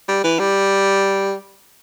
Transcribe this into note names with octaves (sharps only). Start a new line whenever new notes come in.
G3
E3
G3